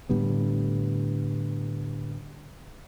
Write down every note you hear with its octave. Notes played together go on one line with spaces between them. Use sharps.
A2 D3 G3 B3